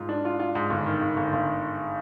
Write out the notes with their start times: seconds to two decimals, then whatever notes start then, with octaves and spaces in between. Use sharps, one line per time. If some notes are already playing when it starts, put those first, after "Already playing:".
Already playing: G#2 F4
0.09 D4
0.25 F4
0.40 F4
0.55 G#2
0.70 G1
0.86 D#3
1.02 G1
1.17 G1
1.33 G1